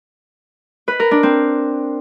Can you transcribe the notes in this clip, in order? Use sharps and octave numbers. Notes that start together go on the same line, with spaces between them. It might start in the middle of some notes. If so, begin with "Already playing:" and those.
B4
A#4
D4
C4